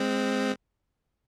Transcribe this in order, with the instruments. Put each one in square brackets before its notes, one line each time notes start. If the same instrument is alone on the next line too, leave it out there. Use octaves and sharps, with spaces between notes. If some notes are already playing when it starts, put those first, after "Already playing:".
Already playing: [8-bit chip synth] G#3 C4